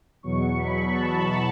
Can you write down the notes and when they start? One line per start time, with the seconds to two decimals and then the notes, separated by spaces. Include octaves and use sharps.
0.23 E2 B2 F#3 C#6
0.58 B5
0.92 A5